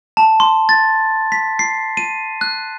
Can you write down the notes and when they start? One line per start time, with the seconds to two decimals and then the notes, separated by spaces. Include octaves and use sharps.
0.17 A5
0.40 C6
0.69 A6
1.32 B6
1.59 C7
1.97 D#7
2.41 F#6